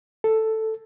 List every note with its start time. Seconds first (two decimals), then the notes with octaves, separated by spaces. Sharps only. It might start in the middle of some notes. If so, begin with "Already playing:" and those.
0.24 A4